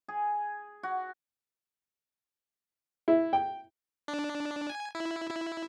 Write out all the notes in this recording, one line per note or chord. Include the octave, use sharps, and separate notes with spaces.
G#4
F#4
E4
G5
D4
G#5
E4
E4